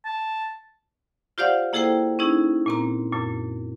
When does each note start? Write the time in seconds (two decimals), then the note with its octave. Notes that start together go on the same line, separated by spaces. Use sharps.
0.05 A5
1.38 F4 G4 C5 D5 F5 F#5
1.73 A#3 E4 G#4 A4 C5 G5
2.19 C#4 D#4 E4 G#4
2.66 A#2 C4 A#5
3.13 F#2 A#2